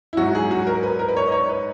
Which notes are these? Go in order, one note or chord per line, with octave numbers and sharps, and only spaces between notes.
E4
G#2 F#3 F#4
G#4
F#4
A#4
B4
A#4
B4
C#5
D#5
C#5
B4